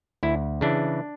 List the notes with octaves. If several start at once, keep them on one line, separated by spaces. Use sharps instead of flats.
D2 E4
C#3 E3 D4